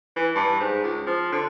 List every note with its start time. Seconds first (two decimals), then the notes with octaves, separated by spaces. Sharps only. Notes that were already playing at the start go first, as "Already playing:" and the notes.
0.16 E3
0.35 G2
0.60 G#2
0.83 C#2
1.06 F3
1.32 D3